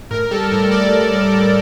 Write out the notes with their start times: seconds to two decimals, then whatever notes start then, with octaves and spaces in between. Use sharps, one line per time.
0.11 A2 A#4
0.31 G3 A4
0.51 A2 A#4
0.72 G3 D5
0.92 A2
1.12 G3
1.33 A2